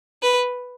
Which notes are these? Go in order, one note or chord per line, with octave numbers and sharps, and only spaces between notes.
B4